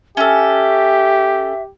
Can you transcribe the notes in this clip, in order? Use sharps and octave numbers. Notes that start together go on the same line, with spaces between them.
C#4 G4 A4 E5